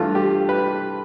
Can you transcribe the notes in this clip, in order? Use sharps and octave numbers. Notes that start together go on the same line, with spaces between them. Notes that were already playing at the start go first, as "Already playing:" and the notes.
Already playing: G2 E3 A3 F4
G4
B4